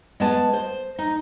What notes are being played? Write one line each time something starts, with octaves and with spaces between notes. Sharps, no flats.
G#3 B3 A5
C5
D#4